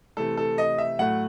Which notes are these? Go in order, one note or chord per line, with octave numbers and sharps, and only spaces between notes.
C3 E3 A3 A4
A4
D#5
E5
A2 F#3 A3 F#5